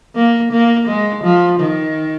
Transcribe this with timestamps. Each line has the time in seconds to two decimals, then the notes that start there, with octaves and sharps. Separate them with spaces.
0.16 A#3
0.52 A#3
0.87 G#3
1.24 F3
1.60 D#3